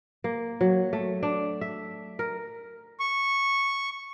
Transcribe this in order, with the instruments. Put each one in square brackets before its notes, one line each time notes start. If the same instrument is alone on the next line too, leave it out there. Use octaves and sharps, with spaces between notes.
[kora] A#3
F#3
A3
D4
E5
A#4
[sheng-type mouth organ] C#6